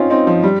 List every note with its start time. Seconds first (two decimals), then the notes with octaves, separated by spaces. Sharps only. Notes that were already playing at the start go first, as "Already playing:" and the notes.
Already playing: C4 C#4 D#4 F4
0.10 C4 D#4
0.27 F3
0.43 G3